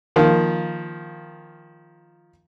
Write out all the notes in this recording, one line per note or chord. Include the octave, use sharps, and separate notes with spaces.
D#3 F3 A#3